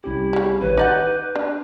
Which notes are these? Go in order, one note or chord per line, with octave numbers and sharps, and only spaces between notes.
C2 C#4 E4 G4
C#3 G3
A1 D#3 B4 C#5
D#4 D5 F#5 D6 G6
D4